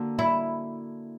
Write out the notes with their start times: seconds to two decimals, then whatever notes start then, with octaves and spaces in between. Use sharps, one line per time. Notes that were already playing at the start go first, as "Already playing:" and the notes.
Already playing: D3 A#3 D4 F#4
0.19 E4